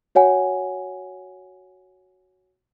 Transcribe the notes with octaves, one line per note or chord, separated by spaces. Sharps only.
F#4 C#5 F#5 G#5